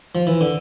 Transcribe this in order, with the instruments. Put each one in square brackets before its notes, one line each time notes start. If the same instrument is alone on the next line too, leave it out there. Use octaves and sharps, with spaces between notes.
[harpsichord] F3
E3
D3